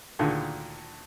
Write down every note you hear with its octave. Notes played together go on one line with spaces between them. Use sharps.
D2 A#2 D3 D#3 G#4